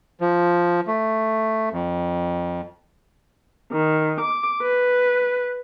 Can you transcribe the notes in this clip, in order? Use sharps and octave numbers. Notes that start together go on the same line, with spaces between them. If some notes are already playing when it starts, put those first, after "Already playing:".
F3
A3
F2
D#3
D6
B4